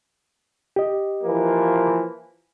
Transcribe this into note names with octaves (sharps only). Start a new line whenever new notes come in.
G4 D#5
E3 F3 A#3